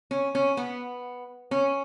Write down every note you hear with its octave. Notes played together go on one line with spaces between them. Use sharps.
C#4
C#4
B3
C#4